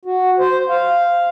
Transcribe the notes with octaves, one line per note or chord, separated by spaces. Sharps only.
F#4
C5
F5